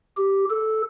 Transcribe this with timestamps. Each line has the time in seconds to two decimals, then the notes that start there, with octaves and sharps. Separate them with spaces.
0.17 G4
0.50 A4